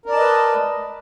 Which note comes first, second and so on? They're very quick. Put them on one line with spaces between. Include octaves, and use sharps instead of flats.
A#4 D5 A5 D#5 B4